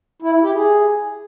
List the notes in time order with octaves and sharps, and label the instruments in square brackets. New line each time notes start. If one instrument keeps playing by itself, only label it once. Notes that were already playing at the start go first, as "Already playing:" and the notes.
[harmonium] E4
E4
G4
G#4